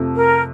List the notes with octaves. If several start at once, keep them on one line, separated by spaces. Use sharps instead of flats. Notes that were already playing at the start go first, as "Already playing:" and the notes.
Already playing: F2 C3 F3 A3
A#4